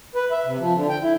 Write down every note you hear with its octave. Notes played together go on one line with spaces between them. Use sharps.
B4
E5
C3
F3
D3
G5
E4